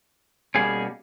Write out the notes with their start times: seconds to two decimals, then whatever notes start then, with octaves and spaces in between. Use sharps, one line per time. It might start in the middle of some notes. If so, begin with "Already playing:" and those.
0.55 B2 G3 A#3 C#4 G#4